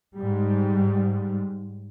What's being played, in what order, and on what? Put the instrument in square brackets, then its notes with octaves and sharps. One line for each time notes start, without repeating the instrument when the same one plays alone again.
[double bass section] G#2 G3